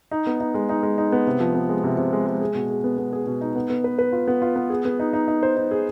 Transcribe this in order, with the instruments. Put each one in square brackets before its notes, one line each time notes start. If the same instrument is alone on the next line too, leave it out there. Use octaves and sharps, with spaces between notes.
[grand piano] D#4
B3
D#4
G#3
D#4
G#3
D#4
B3
C3
F3
B3
G#3
C3
C3
G#3
G#3
G#4
B2
G#4
B3
B3
G#4
B2
D#4
B3
B3
B4
B4
F4
B3
F4
B3
G#4
B3
D#4
D#4
D#4
C5
D#4
G#4